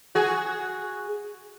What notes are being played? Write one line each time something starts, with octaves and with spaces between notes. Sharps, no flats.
F#4 G#4